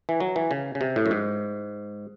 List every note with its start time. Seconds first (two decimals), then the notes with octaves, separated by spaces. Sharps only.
0.09 E3
0.20 F#3
0.36 E3
0.51 C#3
0.75 C#3
0.81 C3
0.96 A2
1.06 F#2
1.11 G#2